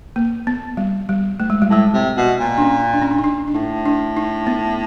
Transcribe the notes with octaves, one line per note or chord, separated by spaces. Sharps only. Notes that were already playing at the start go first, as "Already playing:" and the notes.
A#3
B3
G3
G3
A3
G#3
G3
A2 G#3
C3
B2
A#2
D4
C#4
D4
C#4
D4
D#4
D4
D4
A2 D#4
D4
D#4
B3